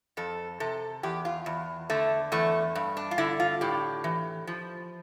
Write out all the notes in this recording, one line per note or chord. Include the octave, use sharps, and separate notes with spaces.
F2 A4
C3 A4
E2 G4
F4
E2
D3 A3
E2 A3
G2
D4
F4
D3 E4
F4
A2 G4
E3
F3